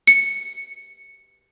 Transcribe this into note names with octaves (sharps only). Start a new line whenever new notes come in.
C#7